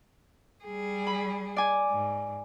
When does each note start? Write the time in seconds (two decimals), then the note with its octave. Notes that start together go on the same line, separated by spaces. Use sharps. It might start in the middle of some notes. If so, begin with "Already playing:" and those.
0.64 G3 G#4
1.07 B5
1.56 D5 G#5
1.90 G#2